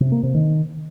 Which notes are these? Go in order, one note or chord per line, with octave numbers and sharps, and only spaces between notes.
C3
A#3
C3
D#3